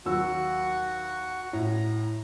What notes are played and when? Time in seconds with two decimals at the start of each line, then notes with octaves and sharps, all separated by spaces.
0.06 D#2 F#3 F#4 E6
1.53 A2 A#5